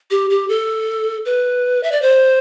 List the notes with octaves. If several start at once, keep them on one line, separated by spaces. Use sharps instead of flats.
G4
G4
A4
B4
E5
D5
C5